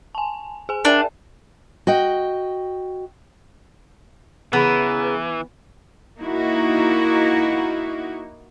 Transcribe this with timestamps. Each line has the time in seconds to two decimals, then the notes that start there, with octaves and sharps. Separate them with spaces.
0.15 G#5 A5
0.69 G#4 G#5
0.85 D4 A#4 E5 G5
1.87 F#4 D#5 G5
4.53 C#3 E3 B3 A#5
6.18 A#3 D#4 E4 F#4